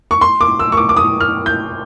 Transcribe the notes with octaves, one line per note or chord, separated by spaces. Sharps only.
C#6
C6
D6
E6
C#6
D6
D6
D#6
F6
G6